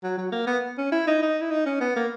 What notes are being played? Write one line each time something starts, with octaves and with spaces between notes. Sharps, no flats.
F#3
F#3
A#3
B3
C#4
E4
D#4
D#4
E4
D#4
C#4
B3
A#3